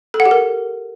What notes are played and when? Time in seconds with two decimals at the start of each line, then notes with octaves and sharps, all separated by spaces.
0.14 A4
0.20 F#5
0.26 G4
0.31 A#4